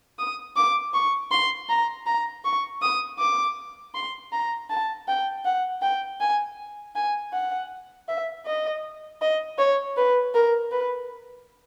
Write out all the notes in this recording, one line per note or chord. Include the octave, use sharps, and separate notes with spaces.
D#6
D6
C#6
C6
A#5
A#5
C#6
D#6
D6
C6
A#5
A5
G5
F#5
G5
G#5
G#5
F#5
E5
D#5
D#5
C#5
B4
A#4
B4